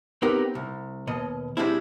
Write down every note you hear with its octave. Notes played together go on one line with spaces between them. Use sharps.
B3 C4 D#4 G4 A#4
C2
D#2 B2 D#5
G3 G#3 C4 D4 E4